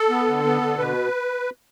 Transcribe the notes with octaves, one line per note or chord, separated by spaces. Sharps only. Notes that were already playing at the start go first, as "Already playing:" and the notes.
Already playing: A4
B3
D3
B3
D3
B2 B4